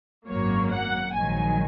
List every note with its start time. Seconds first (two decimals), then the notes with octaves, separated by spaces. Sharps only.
0.27 G#1 F#2 F#3 A#3 C#5
0.71 F#5
1.14 A#1 G#2 D#3 F#3 G#5